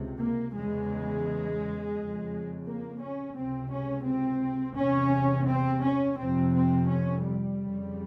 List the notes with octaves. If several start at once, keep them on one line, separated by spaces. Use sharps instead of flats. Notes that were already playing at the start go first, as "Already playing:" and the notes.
Already playing: C#2 C3
A#3
E2 C#3 G#3
F2 C#3
A#3
C#4
C#2 C3 C4
C#4
C4
E2 C3 C#4
C4
C#4
F2 C3 C4
C4
C#4
G3
F2 C#3